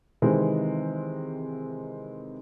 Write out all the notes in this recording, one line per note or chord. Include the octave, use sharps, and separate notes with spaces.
C3 D#3 E3 G#3 C4